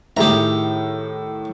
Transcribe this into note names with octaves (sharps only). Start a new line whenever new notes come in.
A2 D#3 G4 G#4 E5 A#5